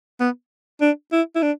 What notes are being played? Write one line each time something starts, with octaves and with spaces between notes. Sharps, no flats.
B3
D4
E4
E4
D4